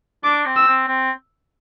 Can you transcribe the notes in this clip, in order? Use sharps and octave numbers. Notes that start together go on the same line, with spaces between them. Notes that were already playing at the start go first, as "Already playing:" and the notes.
D4 D6
C4
E6
C4
C4